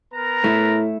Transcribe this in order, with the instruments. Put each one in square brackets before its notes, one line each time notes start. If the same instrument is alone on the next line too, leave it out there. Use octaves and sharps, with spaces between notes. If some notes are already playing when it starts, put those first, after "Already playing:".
[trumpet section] B3 A#4 A#5
[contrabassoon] A2 [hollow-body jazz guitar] A3 E4